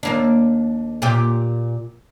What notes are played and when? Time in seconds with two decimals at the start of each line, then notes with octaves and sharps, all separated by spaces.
0.03 D#2 A#3 D4
1.02 A#2 G4